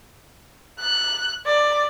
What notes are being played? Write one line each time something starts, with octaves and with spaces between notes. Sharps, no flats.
F#6
D5